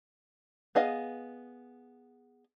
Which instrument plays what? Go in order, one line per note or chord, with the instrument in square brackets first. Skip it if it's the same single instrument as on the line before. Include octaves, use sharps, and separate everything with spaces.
[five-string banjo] B3 G#4 D#5 F5